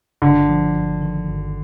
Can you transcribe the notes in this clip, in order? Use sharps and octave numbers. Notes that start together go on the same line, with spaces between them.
G1 D3
F3
G1
D#3
G1